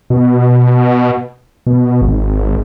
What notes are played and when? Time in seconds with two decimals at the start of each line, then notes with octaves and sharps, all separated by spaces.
0.10 B2
1.67 B2
2.02 G#1